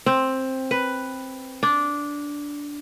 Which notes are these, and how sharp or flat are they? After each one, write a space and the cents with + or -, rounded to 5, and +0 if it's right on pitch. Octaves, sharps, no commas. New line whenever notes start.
C4 +10
B4 +5
D4 -10